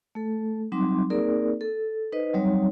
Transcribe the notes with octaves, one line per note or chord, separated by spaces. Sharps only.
A3 A4
F#3 G3 C4 D#4 C6 D6
A#3 C4 D#4 G#4 A#4 D5
A4
D#4 B4 C5 D#5
F#3 G3 C4 D#4 C#5